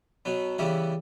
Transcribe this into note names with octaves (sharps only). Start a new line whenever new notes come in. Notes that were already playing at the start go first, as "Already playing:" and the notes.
B2 F#3 B3
C#3 E3 G3 B3 E4